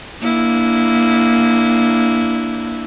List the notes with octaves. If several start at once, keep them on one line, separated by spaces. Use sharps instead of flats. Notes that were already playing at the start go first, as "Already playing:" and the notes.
A#3 D4 E4